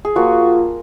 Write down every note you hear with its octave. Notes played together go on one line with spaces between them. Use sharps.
G#4
F3 A#3 F4 F#4